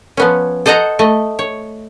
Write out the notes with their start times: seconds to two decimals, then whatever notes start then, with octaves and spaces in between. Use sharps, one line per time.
0.17 F3 B3 C#4
0.66 A4 C5 D#5 F#5 A#5
0.99 A3 D#5
1.39 C#5